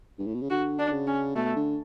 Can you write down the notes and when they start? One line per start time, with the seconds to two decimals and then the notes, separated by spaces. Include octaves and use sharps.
0.19 G2
0.27 A2
0.34 B2
0.42 C#3
0.50 D3 F#4
0.79 D4
0.92 C#3
1.07 C#4
1.35 B2 A3
1.56 D3